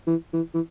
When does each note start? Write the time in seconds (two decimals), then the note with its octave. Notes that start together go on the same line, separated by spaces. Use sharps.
0.07 E3
0.33 E3
0.54 E3